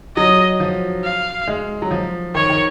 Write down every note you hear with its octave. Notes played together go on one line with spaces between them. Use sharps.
F#3 D#5
F3
F5
G#3
F#3
F3
D#3 C#5
D#3